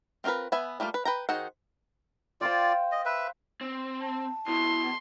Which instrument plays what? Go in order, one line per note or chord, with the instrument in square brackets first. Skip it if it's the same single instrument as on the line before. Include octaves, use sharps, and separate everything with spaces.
[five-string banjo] C4 F4 F#4 A#4 B4
B3 B4 E5 G#5
G3 A3 A#3 F4
B4
B4 G5 A#5
D#3 F#4 G#4 C5 F#5
[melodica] F4 D5 [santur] C5 F5 G5
[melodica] D#5
B4 E5
[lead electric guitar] C4
[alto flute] A5
[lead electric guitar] B2 [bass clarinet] E4 [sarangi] C6